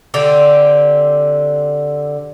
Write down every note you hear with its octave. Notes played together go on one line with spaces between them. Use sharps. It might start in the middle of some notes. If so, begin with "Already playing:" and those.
D3 C4 G4